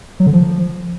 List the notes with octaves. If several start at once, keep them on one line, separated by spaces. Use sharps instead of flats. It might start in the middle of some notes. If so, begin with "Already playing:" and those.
F#3
D3
F3